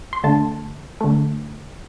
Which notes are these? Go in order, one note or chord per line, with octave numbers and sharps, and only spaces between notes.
C6
D3 A3 A5
D3 A3